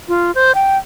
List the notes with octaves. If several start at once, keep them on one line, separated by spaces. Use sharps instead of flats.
F4
C5
G5